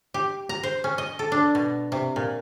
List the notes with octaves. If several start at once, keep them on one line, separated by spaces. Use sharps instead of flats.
G4
A#5
C5
C#4
D#5
A4
D4
B2
C3
A#2